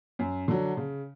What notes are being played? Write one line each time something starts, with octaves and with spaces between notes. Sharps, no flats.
F#2
D3 F#3
C#3